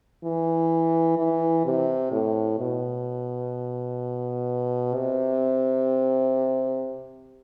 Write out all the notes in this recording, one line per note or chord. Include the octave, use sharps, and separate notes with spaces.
E3
E3
C3
A2
B2
C3